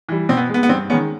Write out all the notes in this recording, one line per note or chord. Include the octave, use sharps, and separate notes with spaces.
E3 G3
B2 C4
B3
G#3 B3
B3
G2 C4
D#3 G#3 B3 C#4